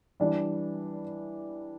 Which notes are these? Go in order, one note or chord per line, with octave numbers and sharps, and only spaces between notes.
E3 G3 D4